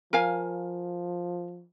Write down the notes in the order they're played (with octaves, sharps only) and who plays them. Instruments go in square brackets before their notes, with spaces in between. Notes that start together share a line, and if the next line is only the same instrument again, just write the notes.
[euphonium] F3 [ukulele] A#4 F5 G#5